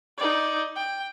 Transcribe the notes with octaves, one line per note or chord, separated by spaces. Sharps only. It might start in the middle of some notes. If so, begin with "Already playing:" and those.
D#4 D5
G5